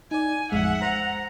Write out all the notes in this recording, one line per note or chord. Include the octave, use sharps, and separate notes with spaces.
D#4 D5 G#5
A1 F2 G#3 E5 F#5
C5 A#5